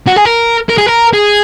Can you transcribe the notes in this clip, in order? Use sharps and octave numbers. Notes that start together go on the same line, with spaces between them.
F#4
G#4
A#4
A#4
G#4
A#4
G#4